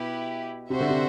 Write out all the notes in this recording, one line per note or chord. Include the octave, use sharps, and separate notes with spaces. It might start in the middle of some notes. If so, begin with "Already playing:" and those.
Already playing: B2 E4 G4 B4
C3 F#4 C5 E5
D3
C3